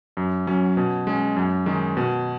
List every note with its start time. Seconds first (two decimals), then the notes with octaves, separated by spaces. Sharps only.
0.17 F#2
0.47 F#3 C#4
0.77 B2
1.07 G#3 C#4
1.37 F#2
1.66 D#3 G#3
1.97 B2